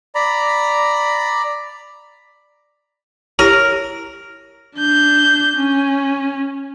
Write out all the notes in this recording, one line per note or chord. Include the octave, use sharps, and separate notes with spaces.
D5 A#5 B5
E4 G4 A#4 C#5
D4 G6
C#4